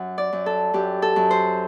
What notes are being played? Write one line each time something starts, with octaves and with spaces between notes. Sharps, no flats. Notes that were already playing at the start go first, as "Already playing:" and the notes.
Already playing: F#2 F#5
D5
F#2
A4
F#2 G4
A4
F#2
C5